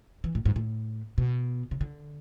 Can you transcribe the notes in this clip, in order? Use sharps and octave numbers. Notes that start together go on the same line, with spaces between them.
E3
A2
G#2
A2
B2
C#3
D3